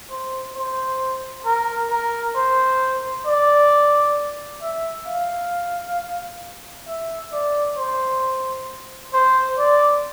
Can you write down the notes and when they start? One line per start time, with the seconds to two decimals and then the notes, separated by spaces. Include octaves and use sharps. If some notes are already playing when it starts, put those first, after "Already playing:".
0.11 C5
0.56 C5
1.46 A#4
1.91 A#4
2.37 C5
3.27 D5
4.62 E5
5.07 F5
6.88 E5
7.33 D5
7.78 C5
9.14 C5
9.59 D5